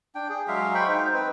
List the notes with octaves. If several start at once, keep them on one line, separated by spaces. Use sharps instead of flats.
D4 G5
G#4
F#3 G#3 E5 F5
C5 G5 B5 C#6
D#4 C5
C4 B4